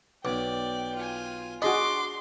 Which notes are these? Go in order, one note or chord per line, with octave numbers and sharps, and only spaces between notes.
B1 D5 G5 D6
F4 G#5
D4 F#4 G#4 D#5 C6 D6